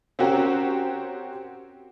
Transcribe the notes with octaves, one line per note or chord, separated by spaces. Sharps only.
C4 C#4 F#4 G4 A#4